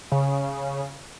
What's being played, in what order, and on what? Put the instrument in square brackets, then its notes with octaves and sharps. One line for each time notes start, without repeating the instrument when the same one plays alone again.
[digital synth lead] C#3